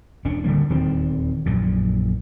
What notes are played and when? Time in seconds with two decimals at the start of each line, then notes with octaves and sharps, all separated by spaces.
0.25 E1 C#4 D4
0.44 D1 D3 G3 A#3
0.70 D#1 E2 D#3 C4
1.46 A#1 F#2 A#2